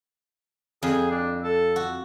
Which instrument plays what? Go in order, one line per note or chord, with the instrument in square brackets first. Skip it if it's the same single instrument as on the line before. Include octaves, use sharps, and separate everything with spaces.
[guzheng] F2 [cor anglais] G#4
[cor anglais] D4
A4
[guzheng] F#4